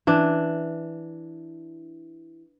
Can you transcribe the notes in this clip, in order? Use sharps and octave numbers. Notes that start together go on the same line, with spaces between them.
E3 D4